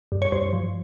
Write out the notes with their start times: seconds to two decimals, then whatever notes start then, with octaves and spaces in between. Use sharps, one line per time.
0.12 G2
0.22 C#5
0.32 G2 C5
0.53 F3